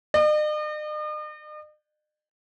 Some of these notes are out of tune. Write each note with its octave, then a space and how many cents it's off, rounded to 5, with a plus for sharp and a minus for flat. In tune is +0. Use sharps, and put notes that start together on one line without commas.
D#5 -45